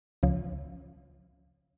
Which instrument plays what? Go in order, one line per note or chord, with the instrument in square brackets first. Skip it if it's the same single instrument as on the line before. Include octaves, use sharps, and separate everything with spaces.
[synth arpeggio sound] C#2 C#3 F3